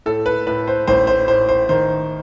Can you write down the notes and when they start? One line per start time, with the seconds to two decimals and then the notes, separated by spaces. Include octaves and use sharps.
0.06 A2 A4
0.26 B4
0.47 A2 B4
0.67 C5
0.87 A1 C5
1.07 C5
1.28 A2 C5
1.49 C5
1.69 D#3 C5